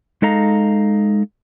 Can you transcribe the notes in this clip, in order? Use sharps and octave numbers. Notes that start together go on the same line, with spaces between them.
G#3 D#4 A4 D#5 F5 A#5